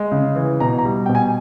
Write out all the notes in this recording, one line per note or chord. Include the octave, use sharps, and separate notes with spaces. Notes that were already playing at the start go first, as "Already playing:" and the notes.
Already playing: G#3
C#3
E3
B2 A#5
A#5
G3
B2 G5
G#5